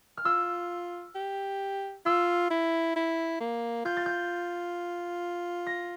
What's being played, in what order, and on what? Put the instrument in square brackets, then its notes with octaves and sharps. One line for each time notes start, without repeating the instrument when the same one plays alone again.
[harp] F6
[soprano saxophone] F4 [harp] E6
[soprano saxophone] G4
[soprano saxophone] F4 [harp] E6
[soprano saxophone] E4
E4
A#3
[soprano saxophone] F4 [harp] G6
[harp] A6
G6
A#6